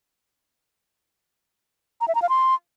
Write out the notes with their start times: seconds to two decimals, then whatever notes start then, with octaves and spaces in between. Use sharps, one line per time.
2.01 A#5
2.08 E5
2.15 A#5
2.22 F5
2.29 C6